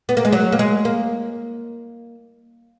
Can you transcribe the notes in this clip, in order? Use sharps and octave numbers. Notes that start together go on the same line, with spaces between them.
B3
A#3
G#3
F#3
A#3
G#3
A#3